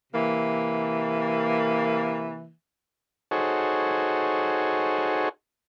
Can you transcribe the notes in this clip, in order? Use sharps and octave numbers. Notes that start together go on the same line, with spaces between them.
C3 E3 A#3
D#4 F#4 G#4 A4 C5 C#5